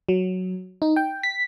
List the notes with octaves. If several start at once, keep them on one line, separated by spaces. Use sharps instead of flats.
F#3
D#4
G5
B6